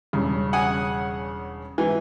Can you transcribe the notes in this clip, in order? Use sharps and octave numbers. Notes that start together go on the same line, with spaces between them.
E1 G2 C#3
F#5 G#5 D#6
G#2 E3